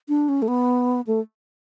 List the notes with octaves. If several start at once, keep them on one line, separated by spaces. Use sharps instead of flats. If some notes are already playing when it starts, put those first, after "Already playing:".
D4
C#4
A3
B3
A3